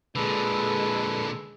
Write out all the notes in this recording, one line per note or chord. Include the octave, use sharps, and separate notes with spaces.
A#2 D3 G#3 A4 B4